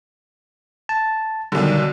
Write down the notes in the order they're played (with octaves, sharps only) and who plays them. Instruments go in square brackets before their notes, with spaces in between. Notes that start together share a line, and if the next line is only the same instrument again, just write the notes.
[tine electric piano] A5
[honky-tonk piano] B1 D3 [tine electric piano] D#3 G3